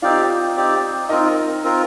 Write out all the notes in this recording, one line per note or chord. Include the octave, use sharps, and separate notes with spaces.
C4 D#4 F4 G4 D5 F5
C4 D#4 G4 D5
C4 D#4 F4 A#4 D#5
C4 F4 A#4